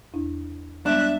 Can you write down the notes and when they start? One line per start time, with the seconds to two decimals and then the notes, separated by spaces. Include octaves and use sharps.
0.14 E2 D4 E4
0.86 G3 G#3 B3 D4 E5 F#6